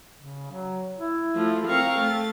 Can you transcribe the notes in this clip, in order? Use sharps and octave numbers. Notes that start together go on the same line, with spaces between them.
C#3
F#3
E4
F3 A3
C4 A#4 F5 C#6
A3 A6